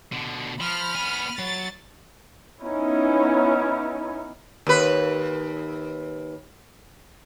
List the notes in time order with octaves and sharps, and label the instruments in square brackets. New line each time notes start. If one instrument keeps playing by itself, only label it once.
[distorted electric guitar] B2 D3
[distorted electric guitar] F3 [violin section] B5 F6
[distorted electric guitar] B3 G#5
[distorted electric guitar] F#3 [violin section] A6
[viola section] B3 C#4 D#4 E4 C#5
[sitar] D#2 B4